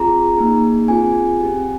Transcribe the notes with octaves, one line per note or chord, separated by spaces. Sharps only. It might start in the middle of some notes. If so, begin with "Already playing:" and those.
Already playing: C4 F4 G#4 A#5
A#3 D#4 G#4
C4 F4 G#4 G#5
C4 G4